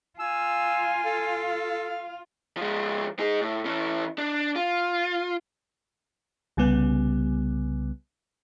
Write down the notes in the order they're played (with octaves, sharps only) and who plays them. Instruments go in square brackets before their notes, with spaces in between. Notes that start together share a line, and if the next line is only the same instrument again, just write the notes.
[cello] F4 [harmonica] F5 [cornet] G#5 [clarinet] E6
[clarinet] A4
[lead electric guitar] F3 G#3
D#4 G#4
A2
E3 C#4
D4
F4
[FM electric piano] C2 C#3 G3 B3